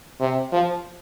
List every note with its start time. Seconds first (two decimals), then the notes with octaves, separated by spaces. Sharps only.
0.21 C3
0.52 F3